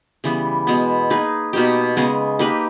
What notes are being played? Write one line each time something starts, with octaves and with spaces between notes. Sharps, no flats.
C#3 E3 G3 B3
B2 G#3 B3
A#3 D#4 G#4 B4
B2 A#3 D#4 G4
C#3 G#3 B3
A#3 D#4 G4 B4